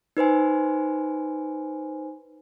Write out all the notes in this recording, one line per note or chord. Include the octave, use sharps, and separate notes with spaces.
D#4 B4 C5 G#5